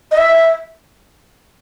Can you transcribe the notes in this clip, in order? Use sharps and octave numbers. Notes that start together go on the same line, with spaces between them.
D#5
E5